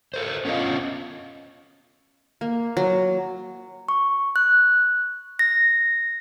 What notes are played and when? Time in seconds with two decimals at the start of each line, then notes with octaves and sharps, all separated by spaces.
0.14 A4 A#4 C5
0.45 B3 C#4 D4 F4 D#5 F5
2.41 A#3
2.77 F#3
3.89 C#6
4.36 F#6
5.39 A#6